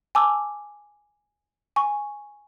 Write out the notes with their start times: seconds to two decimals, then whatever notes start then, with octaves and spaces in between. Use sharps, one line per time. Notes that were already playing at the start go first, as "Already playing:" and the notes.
0.15 G#5 A5 D6 E6
1.76 G#5 C#6